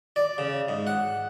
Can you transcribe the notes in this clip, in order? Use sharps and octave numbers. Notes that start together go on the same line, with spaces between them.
D5
C#3
G#2
F#5